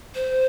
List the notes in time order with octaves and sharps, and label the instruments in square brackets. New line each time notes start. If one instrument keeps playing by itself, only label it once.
[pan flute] C5